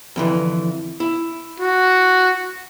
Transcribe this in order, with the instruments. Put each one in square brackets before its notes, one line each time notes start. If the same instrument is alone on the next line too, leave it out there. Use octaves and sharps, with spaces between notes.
[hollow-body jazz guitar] F2 D3 E3
E4
[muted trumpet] F#4